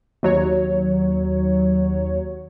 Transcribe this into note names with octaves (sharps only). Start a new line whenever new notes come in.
D#2 F#3 C#5